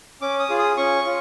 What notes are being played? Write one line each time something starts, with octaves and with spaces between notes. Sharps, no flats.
C#4 D6
D#6
F4 G#4
D#6
C#4 C#6
F4